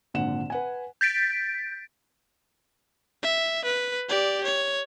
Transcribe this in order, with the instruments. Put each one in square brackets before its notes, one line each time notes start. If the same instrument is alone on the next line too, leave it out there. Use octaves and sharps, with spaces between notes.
[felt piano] G#1 A#2 D3 F#5 E7
B4 F#5 G#5
[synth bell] G6 A6 B6 D7
[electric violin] E5
B4
G4 D5
C#5